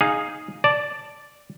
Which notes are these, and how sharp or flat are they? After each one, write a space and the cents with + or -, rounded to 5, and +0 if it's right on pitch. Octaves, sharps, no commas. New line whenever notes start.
D#4 +0 G#4 +0 F5 +10
D5 -5 A5 +0